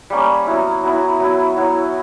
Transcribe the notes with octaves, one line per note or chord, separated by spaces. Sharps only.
G3 A#3 C#4
F#3 B3 E4
F#3 B3 E4
F#3 B3 E4
F#3 B3 E4